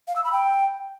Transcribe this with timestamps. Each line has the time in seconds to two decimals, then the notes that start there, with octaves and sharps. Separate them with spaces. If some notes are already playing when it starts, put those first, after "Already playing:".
0.08 F5
0.16 E6
0.24 B5
0.32 G5